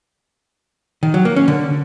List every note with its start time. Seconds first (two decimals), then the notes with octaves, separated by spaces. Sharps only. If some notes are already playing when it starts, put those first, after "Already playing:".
1.03 D#3
1.14 F#3
1.25 A#3
1.36 C#4
1.48 D3